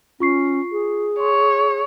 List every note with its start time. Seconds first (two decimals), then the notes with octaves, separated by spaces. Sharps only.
0.20 C#4 F4 C#6 C7
0.72 G#4
1.20 C#5 C6